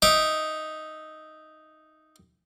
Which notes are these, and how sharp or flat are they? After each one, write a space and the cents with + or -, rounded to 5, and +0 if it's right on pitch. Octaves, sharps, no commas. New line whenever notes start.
D#4 +0 E5 -5 D6 +0